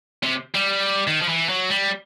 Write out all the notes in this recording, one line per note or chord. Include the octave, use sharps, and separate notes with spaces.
C3
G3
D#3
F3
E3
F#3
G3